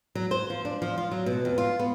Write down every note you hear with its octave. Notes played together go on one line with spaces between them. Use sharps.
F#3
C5
F3
D4
F3
F4
F#3
B2
F2
F4
B3